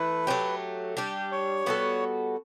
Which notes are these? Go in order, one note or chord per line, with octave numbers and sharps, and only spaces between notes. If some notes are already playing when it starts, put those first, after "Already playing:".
Already playing: E3 A3 E4 B4
F#3 A3 C#4 G4
G3 D4 G4
C#5
G3 B3 F#4 A4